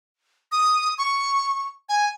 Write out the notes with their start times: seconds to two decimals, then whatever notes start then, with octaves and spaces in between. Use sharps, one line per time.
0.52 D#6
0.98 C#6
1.89 G#5